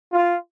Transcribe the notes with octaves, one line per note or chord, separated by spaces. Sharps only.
F4